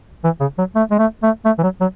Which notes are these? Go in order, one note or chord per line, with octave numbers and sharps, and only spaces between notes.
E3
C#3
F#3
A3
G#3
A3
A3
A3
E3
F#3
F#3